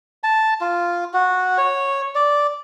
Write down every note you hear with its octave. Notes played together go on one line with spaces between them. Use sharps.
A5
F4
F#4
C#5
D5